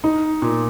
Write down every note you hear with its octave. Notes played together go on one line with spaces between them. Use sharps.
D#4
A#2